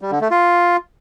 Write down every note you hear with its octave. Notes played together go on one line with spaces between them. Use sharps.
G3
D3
A3
F4